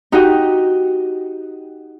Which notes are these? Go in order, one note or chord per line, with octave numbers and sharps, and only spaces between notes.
D#4 F#4 G4 D#5